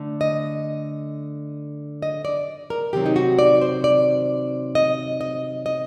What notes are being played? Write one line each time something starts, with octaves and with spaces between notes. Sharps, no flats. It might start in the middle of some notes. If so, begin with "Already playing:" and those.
Already playing: D3 A3
D#5
D#5
D5
A#4
C3 D#3 F#3 C4 G4
D#4
F#4
D5
C5
D5
D#5
D#5
D#5